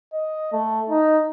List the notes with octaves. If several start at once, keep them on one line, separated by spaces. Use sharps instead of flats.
D#5
A3
D#4